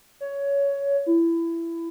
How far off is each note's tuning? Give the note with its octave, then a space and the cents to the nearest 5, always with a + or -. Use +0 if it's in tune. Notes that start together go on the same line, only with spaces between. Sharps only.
C#5 +15
E4 +20